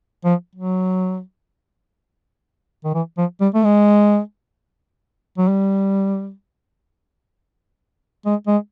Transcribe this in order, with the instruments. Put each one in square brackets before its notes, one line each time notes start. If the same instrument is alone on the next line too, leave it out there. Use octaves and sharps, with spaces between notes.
[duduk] F3
F#3
D#3
E3
F3
G3
A3
G#3
F#3
G3
G#3
G#3